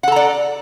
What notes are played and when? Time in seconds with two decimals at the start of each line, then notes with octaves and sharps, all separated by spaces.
0.03 F#5
0.08 A4
0.12 A#5
0.16 D5